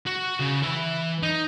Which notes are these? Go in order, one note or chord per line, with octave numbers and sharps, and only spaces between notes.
F#4
C#3
E3 E5
D#4